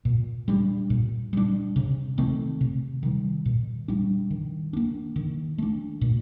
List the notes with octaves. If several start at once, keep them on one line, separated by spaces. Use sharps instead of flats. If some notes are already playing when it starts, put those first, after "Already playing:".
A#2
G3 D4
A#2
G3 D4
C3
D#3 A3 C4
C3
D#3 G3
A#2
G3 D4
D#3
A#3 D4
D#3
A3 D4
A#2